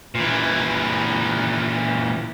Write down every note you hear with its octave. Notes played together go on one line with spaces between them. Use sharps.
A#2 E3